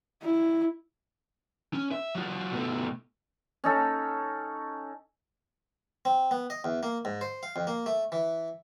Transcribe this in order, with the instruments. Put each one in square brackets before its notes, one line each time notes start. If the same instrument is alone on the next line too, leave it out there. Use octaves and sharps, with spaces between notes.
[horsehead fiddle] E4
[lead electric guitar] C#4
E5
F#3 F4
B2 A3
[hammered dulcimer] C#4 D#4 A4
[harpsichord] C4
B3
D#5
E2
A#3
G#2
C5
F5
F2
A#3
A3
E3